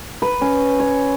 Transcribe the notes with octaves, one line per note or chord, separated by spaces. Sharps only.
B4
C#4
C#5